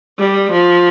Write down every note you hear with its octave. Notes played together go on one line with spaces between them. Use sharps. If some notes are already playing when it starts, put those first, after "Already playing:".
G3
F3